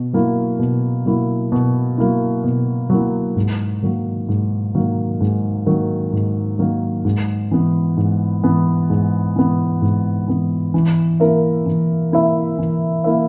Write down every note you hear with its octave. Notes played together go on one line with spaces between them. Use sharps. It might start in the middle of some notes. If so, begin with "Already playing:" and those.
Already playing: B2
F#3 A#3 E4
B2
F#3 A#3 E4
B2
F#3 A#3 E4
B2
F#3 A#3 E4
G#2
D#3 F#3 A#3
G#2
D#3 F#3 A#3
G#2
D#3 F#3 A#3
G#2
D#3 F#3 A#3
G#2
E3 B3
G#2
E3 B3
G#2
E3 B3
G#2
E3 B3
E3
A#3 E4 A#4 E5
E3
A#3 E4 A#4 E5
E3
A#3 E4 A#4 E5